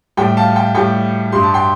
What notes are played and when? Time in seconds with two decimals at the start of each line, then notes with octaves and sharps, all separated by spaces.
0.17 A2 G3 G5
0.37 F5 A5
0.56 G5
0.74 A2 G3 G5
1.32 G2 G3 C6
1.43 A5
1.54 G5 C6